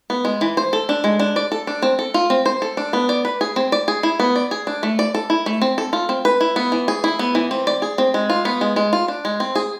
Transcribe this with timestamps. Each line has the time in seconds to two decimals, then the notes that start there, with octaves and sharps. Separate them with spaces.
0.10 B3
0.25 G#3
0.41 E3
0.57 C5
0.73 A4
0.89 D4
1.04 G#3
1.19 D4
1.36 D5
1.52 A4
1.67 D4
1.82 C4
1.99 A4
2.14 F4
2.30 C4
2.46 C5
2.62 A4
2.77 D4
2.93 B3
3.09 D5
3.25 B4
3.41 G#4
3.56 C4
3.72 D5
3.88 G#4
4.03 E4
4.20 B3
4.36 D5
4.51 G#4
4.67 D4
4.83 A3
4.99 D5
5.14 A4
5.30 E4
5.46 A3
5.62 C4
5.78 A4
5.93 F4
6.09 C4
6.25 B4
6.41 E4
6.56 B3
6.72 E3
6.88 G#4
7.04 E4
7.19 B3
7.35 E3
7.51 C4
7.67 D5
7.82 G#4
7.98 C4
8.14 G#3
8.30 F4
8.45 B3
8.61 G#3
8.76 G#3
8.93 F4
9.08 D4
9.25 G#3
9.40 C4
9.55 G#4